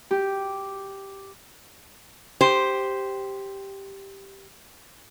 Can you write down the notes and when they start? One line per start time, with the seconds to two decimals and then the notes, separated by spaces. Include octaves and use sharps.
0.11 G4
2.41 G4 C5